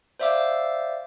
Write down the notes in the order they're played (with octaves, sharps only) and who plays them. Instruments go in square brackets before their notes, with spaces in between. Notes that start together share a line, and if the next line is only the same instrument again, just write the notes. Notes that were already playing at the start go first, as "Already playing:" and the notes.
[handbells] C5 D5 E5 F5 D6 E6